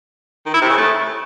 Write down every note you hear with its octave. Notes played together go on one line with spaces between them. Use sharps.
D#3
E4
C3
C#3
A3